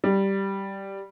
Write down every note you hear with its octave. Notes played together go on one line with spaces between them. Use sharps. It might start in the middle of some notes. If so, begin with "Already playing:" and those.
G3